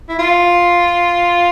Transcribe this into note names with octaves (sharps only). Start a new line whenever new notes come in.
E4
F4